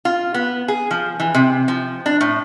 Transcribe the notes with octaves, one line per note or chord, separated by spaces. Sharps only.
F4
B3
G#4
F3
E3
C3
F3
D4
A2